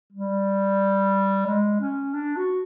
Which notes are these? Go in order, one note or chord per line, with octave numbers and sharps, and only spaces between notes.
G3
G#3
C#4
D4
F#4